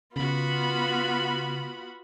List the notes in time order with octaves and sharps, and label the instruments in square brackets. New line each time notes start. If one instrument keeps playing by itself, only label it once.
[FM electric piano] C#3 [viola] B3 F4 [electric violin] F#4 B5